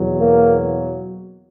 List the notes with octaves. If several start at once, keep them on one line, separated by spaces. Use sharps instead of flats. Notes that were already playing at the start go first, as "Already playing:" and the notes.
Already playing: E2 B2 F#3
A#3